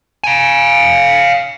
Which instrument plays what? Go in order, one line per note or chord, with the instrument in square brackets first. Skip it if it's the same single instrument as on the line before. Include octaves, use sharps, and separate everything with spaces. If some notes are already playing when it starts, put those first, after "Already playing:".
[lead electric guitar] F5 G#5